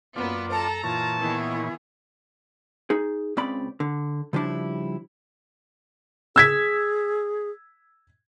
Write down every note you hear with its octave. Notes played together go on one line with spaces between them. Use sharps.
F#2 A#3 B3 F4 D5
A4 A5 A#5
A#2 E3 F4 C#5 A5
D#3 B3 E4 G#4
D#4 G#4
C#2 C#3 C4 D5 B5
D3
C#3 F3 G3 D4 E4
G#4 E6 G#6 B6